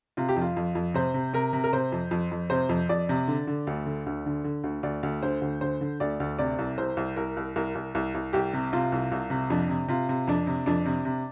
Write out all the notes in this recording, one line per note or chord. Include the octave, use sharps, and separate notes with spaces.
C3 F4
G4
F2
F4
F2
F2
C3 C5
C3
C3 A#4
C3
A#4
C3 C5
F2
F2
F2
C3 C5
F2
F2 D5
C3
D3
D3
D2
D3
D2
D3
D3
D2
D2 D5
D2
D3 C5
D2
D3 C5
D3
D2 D5
D2
C3 D5
C2
C2 C5
C2
C2 A#4
C2
C2 A#4
C2
C2
C2
C2 G4
C3
C3 F4
C2
C2
C3
F2 D4
C3
C3 F4
C3
F2 D4
C3
F2 D4
C3
C3